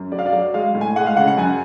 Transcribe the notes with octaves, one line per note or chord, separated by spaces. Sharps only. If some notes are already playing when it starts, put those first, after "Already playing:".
Already playing: F#2
F#3 D5
F5
D5
F#3
G#3 F5
A2
G#5
G#3 F#5
F5
C#3 F#5
F#5
F#2 G#5